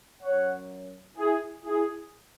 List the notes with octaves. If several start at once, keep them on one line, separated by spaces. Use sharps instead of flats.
F#2 F#3 C#5 F#5
E4 G#4
E4 G#4